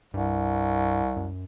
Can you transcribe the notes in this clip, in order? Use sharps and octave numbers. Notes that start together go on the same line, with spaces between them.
C2 G2
F#2